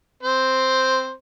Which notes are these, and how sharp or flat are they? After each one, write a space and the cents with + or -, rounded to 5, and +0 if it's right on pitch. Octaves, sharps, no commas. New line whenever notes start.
C4 +0 C5 +0